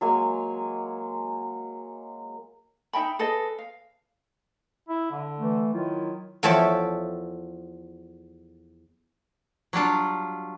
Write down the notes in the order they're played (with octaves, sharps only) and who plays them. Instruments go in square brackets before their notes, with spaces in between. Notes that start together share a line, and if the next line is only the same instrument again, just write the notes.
[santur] F#3 G#3 A#3 G#5
[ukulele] D#4 E5 G5 B5
G#4 A4 B4 D#5
F5
[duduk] E4
D3
[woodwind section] E3 A3
[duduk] D#3 [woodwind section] F#3 E4 F4
[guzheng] E2 F3 A4 C#5 E5 G5
[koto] F#3 G3 D4 F4